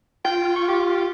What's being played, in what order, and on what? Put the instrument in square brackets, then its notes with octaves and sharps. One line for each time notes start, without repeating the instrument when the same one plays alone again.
[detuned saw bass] F4 [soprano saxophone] G5
[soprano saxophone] C#6
G4